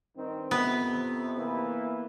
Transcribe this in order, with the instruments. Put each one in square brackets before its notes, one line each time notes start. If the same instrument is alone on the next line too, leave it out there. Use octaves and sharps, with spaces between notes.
[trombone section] G2 D#3 C4
[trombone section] F2 C3 [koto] B3
[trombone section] E3 A#3